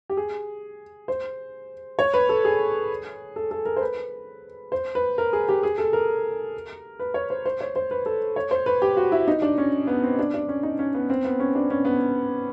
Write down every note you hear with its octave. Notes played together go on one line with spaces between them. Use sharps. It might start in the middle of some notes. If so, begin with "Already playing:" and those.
G4
G#4
C5
C#5
B4
A4
G#4
A4
A4
A#4
C5
B4
C5
B4
A#4
G#4
G4
G#4
A4
A#4
B4
C#5
C5
C5
C#5
C5
B4
A4
C#5
C5
B4
G4
F#4
E4
D#4
D4
C#4
B3
C4
D4
D4
C#4
D#4
C#4
B3
C4
B3
C#4
D4
C#4
B3